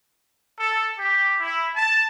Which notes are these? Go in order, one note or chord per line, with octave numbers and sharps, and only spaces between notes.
A4
G4
E4
A5